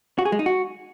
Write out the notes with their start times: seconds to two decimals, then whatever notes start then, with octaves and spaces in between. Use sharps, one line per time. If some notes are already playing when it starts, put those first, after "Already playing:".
0.19 F#4
0.25 G#4
0.32 G#3
0.39 D#4
0.46 F#4